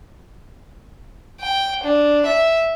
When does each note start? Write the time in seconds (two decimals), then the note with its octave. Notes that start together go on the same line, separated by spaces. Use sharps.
1.41 G5
1.84 D4
2.26 E5